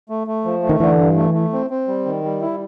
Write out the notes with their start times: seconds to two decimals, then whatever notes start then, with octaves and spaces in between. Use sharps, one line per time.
0.09 A3
0.27 A3
0.45 F3
0.63 A3
0.69 D#3
0.80 D3 E3
0.98 G2
1.17 A3
1.34 A3
1.53 C4
1.70 C4
1.88 G3
2.05 D#3
2.24 G3
2.41 E4